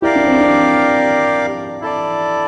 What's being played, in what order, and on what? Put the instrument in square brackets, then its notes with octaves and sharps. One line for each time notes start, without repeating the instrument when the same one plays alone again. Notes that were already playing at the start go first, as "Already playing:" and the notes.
[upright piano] E4 [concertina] G4 A#4 D5 F5
[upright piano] D4
C4
D4
[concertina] E4 A4 D5